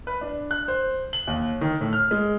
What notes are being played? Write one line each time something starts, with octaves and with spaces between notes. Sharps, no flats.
B4
D4
F#6
C5
F#7
D#2
D#3
A2
F6
G#3